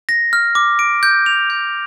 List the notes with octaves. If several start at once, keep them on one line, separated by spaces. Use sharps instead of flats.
A#6
F6
D6
D7
G6
F7
G6